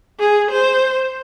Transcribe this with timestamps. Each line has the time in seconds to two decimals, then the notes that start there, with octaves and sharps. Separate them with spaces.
0.19 G#4
0.51 C5